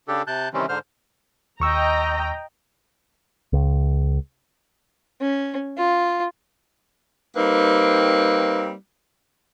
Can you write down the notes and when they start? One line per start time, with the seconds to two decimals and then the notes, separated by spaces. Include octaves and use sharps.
0.08 C#3 D4 G4 A4
0.27 C3 A5 F#6 G6
0.54 C3 D#3 E3 G3 C4 C#4
0.69 G#2 D3 C5 F6
1.60 D#2 D#5 G5 A#5 C#6 E6
3.53 C#2
5.21 C#4
5.77 F4
7.36 G3 A#3 C4 D#4 B4